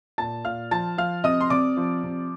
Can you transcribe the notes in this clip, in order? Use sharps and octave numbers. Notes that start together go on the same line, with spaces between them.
A#2 A5 A6
A#2 F5 F6
F3 A5 A6
F3 F5 F6
C3 D#5 D#6
C6
C3 D5 D6
F3
C3